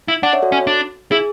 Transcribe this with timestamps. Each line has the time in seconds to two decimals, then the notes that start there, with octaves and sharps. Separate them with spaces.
0.08 E4
0.23 D4 D5 F#5
0.33 C#5 E5
0.42 F#4 A4
0.52 C#4
0.67 D4
1.11 E4 G#4